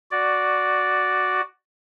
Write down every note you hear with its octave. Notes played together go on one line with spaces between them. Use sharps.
F#4 D5